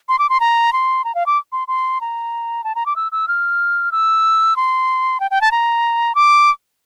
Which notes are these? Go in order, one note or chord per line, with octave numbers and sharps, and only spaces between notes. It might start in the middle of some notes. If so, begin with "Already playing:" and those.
C6
D6
C6
A#5
C6
A#5
F5
D6
C6
C6
A#5
A5
A#5
D6
E6
E6
F6
E6
C6
G5
G5
A5
A#5
D6